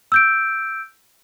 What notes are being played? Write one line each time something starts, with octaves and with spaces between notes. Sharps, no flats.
E6 G6 D7